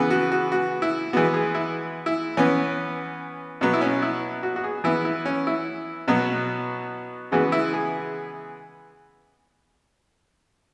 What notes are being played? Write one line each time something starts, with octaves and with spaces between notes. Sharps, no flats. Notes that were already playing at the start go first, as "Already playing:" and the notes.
Already playing: C#3 E3 B3
F#4
F#4
F#4
E4
E3 G#3 B3 F#4
G#4
E4
E4
E3 B3 C#4
B2 F#3 B3
E4
C#4
E4
F#4
F#4
G#4
E3 B3 E4
E4
C#4
E4
B2 F#3 B3
C#3 E3 G#3 B3 F#4
E4
G#4